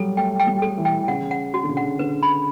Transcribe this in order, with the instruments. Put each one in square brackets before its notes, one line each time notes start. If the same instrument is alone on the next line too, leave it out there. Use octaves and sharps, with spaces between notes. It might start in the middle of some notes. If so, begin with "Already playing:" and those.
Already playing: [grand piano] F#3 G3 [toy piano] A4
[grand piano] A3 [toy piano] G5
[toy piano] G5
[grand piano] G3
[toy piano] A4
[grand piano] E3
[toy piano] G5
[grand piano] C#3 [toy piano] F#5
[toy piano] F#5
F#4
[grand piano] D3
C#3
[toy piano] F#5
[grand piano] D3 [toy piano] B4
[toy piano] B5